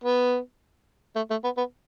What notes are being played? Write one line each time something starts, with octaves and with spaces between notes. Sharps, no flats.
B3
A3
A3
B3
B3